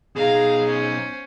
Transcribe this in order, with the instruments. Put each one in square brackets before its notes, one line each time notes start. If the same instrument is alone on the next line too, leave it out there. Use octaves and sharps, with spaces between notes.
[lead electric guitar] B2 D#4 [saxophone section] G#4 [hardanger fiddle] F5 A#5
[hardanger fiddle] C#4 C5